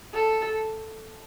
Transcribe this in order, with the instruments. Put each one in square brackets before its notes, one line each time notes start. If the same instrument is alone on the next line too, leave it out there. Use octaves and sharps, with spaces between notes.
[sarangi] A4